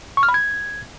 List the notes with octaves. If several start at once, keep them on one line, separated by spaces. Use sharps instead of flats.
C#6
F6
B5
G#6